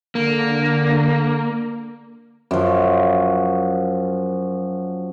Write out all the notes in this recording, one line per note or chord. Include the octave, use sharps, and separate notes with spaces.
D3 A#3
F#2 F3